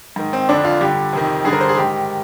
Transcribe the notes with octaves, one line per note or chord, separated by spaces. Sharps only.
G#2 D#3
C4
F2 D3 D4
F4
G2 D3 G4
F2 C3 D#3
G2 D3 G#4
A#4
C5
G#4
G#2 D#3 G4